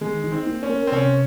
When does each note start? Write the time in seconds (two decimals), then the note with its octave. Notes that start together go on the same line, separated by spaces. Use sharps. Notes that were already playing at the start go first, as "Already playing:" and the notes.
0.01 D#3 G#3
0.24 D#4
0.32 C4
0.46 A#3
0.63 C#4
0.70 A#4
0.87 C4
0.92 C3 C#4